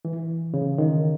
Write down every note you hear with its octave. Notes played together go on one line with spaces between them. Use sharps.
E3
C#3
D#3